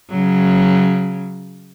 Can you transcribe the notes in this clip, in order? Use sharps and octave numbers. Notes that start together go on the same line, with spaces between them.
C#3 F#3